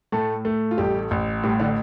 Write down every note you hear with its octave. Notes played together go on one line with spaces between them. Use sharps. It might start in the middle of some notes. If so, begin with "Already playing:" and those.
A2 A3 A4
A3
F4
A1 G3 G4
A1
A2 G3 G4
D3 D4